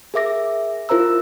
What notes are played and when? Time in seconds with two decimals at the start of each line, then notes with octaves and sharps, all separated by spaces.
0.14 G#4 A#4 E5 D6 A#6
0.89 E4 F4 A#4 C5 A#5 E6